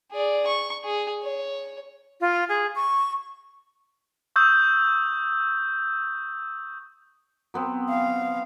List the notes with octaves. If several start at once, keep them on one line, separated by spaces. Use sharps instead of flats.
G#4 D5
C#6
G#4
C#5
F4
G#4
C#6
C#6 D#6 E6 G6
F#3 B3 C4
F5